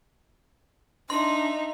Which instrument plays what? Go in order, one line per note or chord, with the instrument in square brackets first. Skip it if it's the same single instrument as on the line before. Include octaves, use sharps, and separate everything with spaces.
[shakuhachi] D4 [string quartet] D#4 E5 [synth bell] C6